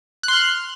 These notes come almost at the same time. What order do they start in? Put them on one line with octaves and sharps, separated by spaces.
F#6 C6 F6